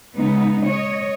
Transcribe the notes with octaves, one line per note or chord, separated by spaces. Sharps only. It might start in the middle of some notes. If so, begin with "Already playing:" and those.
C#3 G#3 B3 D#4
C#5 D#5